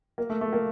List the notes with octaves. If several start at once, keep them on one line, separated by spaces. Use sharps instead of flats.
A#3
A3
A3
A#3